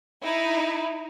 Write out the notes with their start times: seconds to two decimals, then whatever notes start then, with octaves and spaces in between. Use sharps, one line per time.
0.22 D#4 E4